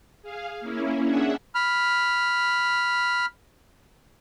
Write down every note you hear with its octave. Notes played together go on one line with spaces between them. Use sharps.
G#4 F5
A#3 C#4 E4
C#4 D4 G#4 E5 F#5
B5 F6